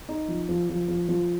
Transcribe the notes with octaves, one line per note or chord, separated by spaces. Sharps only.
D#4
F3
F3
F3
F3
F3